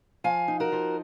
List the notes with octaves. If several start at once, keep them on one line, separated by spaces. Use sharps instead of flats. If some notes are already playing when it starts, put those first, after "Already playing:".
F3 F5 G#5
D#4
F#4 A#4
F3